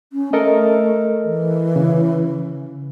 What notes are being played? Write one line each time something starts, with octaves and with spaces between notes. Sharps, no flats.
C#4
A3 A4 A#4 D#5
E3
C#3